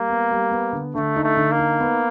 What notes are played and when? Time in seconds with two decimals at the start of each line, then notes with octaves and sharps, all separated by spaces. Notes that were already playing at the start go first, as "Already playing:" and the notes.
Already playing: G3 A#3
0.10 B3
0.31 G3
0.52 B3
0.73 D3
0.95 D3 A3
1.16 D#4
1.23 A3
1.37 D3
1.51 A#3
1.59 D#4
1.80 B3